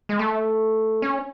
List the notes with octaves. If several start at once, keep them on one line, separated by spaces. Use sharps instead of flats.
G#3
A3
C#4